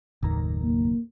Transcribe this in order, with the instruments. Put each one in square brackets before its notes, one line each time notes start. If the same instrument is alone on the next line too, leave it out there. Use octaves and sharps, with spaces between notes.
[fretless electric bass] F#1 D#3 [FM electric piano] D#2 A2 A#5
[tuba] A#3